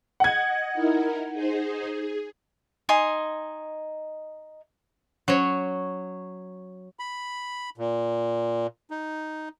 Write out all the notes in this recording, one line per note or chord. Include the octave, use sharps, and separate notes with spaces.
D#5 F#5 G#6
D#4 E4 A#4
D#4 G#4 C5
G#4
D#4 D#5 G#5 C6
F#3 C#4 C5 C#5
B5
A#2
D#4